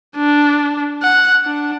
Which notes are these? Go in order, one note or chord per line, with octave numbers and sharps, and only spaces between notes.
D4
F#5
D4